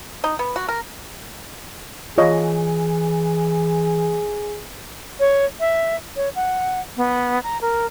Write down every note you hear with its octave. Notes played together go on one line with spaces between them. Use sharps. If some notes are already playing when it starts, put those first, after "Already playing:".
D#4
B3
F#4
A#4
E3 F4 G#4 C#5 D#5
C#5
E5
C#5
F#5
B3
A#5
A#4